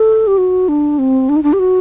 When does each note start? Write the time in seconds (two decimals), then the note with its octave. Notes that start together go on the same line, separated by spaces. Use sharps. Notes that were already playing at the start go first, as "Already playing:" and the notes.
Already playing: A4
0.27 G4
0.38 F#4
0.69 D4
0.99 C4
1.29 D4
1.36 D#4
1.43 D4
1.53 G4
1.59 F#4